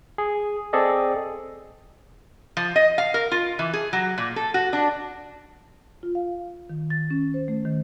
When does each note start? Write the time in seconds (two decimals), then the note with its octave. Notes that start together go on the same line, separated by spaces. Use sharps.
0.18 G#4
0.73 C4 G#4 A4 D5 D#5
2.57 F3
2.76 D#5
2.98 F5
3.14 A#4
3.32 F4
3.59 E3
3.73 G#4
3.93 F#3
4.18 A#2
4.36 A4
4.54 F#4
4.73 D4
6.03 F4
6.15 F5
6.70 D#3
6.90 A6
7.11 C#4
7.34 C5
7.48 A3
7.65 D#3